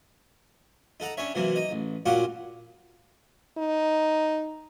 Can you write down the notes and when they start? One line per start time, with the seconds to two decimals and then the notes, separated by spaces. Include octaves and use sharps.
1.00 D#4 A4 F#5 A#5
1.17 C#4 D4 C#5 E5
1.35 C3 E3 F#3 A#3
1.56 D#4 D#5
1.71 A1
2.06 A#2 C#4 F4 F#4 F#5 D6
3.58 D#4